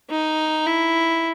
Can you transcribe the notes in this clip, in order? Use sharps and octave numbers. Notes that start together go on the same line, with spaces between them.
D#4
E4